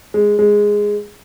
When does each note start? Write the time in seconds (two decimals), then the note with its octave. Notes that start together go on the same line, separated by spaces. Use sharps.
0.14 G#3
0.39 G#3